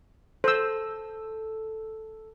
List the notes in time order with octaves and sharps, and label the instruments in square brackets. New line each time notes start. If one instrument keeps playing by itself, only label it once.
[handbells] A4 [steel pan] C5 E6